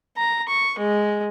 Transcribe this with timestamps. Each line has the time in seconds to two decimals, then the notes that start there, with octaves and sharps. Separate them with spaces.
0.17 A#5
0.48 C#6
0.79 G#3